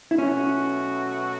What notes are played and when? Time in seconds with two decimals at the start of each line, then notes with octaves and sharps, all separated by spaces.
0.11 E4
0.18 B2 F#3 A3 C#4 F#4